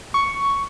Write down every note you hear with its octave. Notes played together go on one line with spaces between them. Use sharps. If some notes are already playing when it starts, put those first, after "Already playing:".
C#6